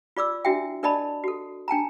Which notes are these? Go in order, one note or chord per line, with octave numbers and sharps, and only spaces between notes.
F4 D5 D6 E6
D4 E4 F#4 E5 G5
D4 A#4 D5 D#5 A5 B5
F#4 A4
D4 G5 A5 A#5